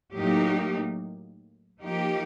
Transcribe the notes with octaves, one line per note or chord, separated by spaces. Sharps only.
A2 F#3 A#3 D#4 G4
F3 A#3 D#4 G4